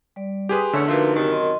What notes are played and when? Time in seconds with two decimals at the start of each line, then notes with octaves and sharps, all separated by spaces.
0.16 G3 D5
0.49 G4 G#4 B4 G#5 C6 D#6
0.73 E2 D3 A3 C#4
0.88 F3 A3 A#3 D#4 F#4 B4
1.15 F#2 C3 D#3 D#4 G4
1.31 D#5 C6